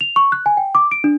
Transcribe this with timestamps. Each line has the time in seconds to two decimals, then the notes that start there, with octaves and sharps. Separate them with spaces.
0.01 F7
0.16 C#6
0.32 F#6
0.46 G#5
0.57 G5
0.75 D6
0.91 D7
1.04 D4